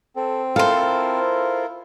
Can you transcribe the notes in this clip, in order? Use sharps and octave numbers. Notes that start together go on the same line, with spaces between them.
C4 A4
E4 F4 A4 A#4 C5 F5